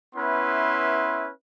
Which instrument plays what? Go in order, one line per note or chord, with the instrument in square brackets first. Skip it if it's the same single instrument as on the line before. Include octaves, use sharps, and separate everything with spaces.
[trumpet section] B3 C#4 E4 B4 E5 C6